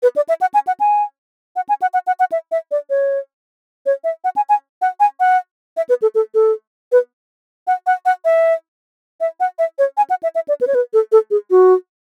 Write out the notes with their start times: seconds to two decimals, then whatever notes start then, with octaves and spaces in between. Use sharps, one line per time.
0.03 B4
0.16 D5
0.29 E5
0.41 F#5
0.54 G#5
0.67 F#5
0.80 G#5
1.56 F#5
1.69 G#5
1.82 F#5
1.94 F#5
2.07 F#5
2.20 F#5
2.32 E5
2.52 E5
2.71 D5
2.90 C#5
3.86 C#5
4.04 E5
4.24 F#5
4.36 G#5
4.49 G#5
4.82 F#5
5.00 G#5
5.20 F#5
5.77 E5
5.89 B4
6.02 A4
6.15 A4
6.34 A4
6.92 B4
7.67 F#5
7.87 F#5
8.06 F#5
8.25 E5
9.21 E5
9.40 F#5
9.59 E5
9.79 C#5
9.97 G#5
10.10 F#5
10.23 E5
10.35 E5
10.48 D5
10.61 B4
10.67 C#5
10.75 B4
10.93 A4
11.12 A4
11.31 G#4
11.51 F#4